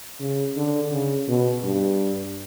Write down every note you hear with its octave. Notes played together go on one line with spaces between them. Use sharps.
C#3
D3
C#3
B2
G2